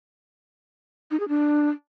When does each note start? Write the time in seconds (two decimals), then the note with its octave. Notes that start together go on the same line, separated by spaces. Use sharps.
1.11 D#4
1.20 G#4
1.29 D4